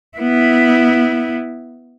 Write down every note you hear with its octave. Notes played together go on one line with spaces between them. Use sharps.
B3 E4